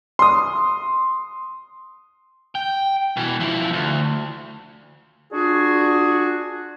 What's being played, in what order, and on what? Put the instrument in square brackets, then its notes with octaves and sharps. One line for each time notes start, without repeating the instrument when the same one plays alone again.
[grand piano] C6 D#6
[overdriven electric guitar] G5
B2 E3
F3 E4
D2
[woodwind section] D4 F4 F#4 G#4